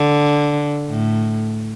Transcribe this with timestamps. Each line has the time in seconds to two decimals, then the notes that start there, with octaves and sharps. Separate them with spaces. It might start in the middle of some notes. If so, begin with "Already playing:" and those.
Already playing: D3
0.90 A2